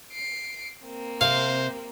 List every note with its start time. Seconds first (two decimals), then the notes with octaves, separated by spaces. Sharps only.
0.12 C7 D7
0.84 A#3 C4
1.21 C3 C5 F5